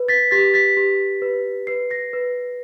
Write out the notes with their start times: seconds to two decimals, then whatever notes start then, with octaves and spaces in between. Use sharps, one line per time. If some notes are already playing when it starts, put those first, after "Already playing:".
Already playing: B4
0.08 A6 B6
0.31 G4 A6 B6
0.54 A6 B6
0.77 G4
1.22 B4
1.67 B4 C7
1.90 A#6 C7
2.13 B4